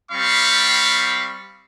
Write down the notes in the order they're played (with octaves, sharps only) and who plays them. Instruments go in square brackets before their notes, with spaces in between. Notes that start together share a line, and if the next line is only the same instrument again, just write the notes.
[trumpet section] G3 C4 F5 B5 C#6